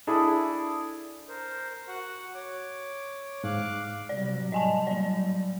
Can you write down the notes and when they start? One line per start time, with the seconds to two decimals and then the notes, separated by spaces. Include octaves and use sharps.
0.07 D4 E4 G#4 A4
1.29 A#4 C5
1.88 F#4 F#5
2.35 C#5 D6
3.44 G#2 F5 D6 F#6
4.09 C3 F#3 G3 D5
4.52 A2 G3 D#5 G#5 A5
4.87 F#3 D5